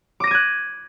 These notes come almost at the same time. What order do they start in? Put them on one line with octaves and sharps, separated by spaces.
D6 A#6 D#7 G#6 F#6